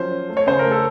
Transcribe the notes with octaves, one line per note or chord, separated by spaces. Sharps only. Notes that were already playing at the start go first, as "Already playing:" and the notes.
Already playing: F3 F#3 C#4 C5
C#4
A3
C#5
C#3 C5
A3 A#4
A4